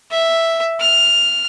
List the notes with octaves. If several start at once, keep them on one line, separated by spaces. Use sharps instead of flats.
E5
F6